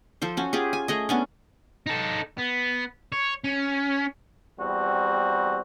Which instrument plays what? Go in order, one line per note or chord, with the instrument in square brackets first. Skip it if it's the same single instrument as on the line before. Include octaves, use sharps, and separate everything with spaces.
[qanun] F3 A4 C5
C#4 F#4
F4 G4 G#4
G#5
A3 G#4 D#5
B3 C#4 D4
[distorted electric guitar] D#4 A4
B3
C#5
C#4
[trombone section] E2 G3 C4 F#4